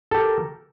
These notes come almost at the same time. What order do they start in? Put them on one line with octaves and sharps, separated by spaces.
A4 G4 A#4